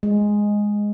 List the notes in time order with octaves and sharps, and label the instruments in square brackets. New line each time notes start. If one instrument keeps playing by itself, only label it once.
[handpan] G#3